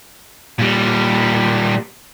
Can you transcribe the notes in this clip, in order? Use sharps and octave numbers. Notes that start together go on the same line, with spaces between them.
A#2 G3